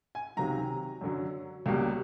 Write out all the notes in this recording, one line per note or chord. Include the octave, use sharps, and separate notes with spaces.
G#5
C#2 C3 D#3 F#3 A#5
F#2 D3 F#3
C#2 B2 G3 A#3